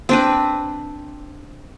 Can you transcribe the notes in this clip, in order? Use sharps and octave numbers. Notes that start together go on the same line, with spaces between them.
C4 D4 B4